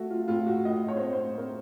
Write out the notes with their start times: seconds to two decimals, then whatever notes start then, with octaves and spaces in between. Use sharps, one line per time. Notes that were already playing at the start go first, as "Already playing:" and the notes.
Already playing: A3 F#4
0.10 F4
0.28 A2 F4
0.47 F#4
0.65 A2 D#5
0.88 C#5
0.96 C5
1.01 A2 C#5
1.13 C5
1.37 A2 A#4